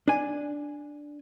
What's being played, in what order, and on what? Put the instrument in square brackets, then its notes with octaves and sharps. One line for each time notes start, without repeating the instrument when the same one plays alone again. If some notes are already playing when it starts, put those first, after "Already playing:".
[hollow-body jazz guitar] D4 G#5